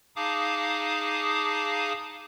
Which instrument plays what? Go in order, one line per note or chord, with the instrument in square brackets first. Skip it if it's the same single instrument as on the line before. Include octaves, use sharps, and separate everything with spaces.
[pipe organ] D#4 G#4 F5 A5 D6 D#6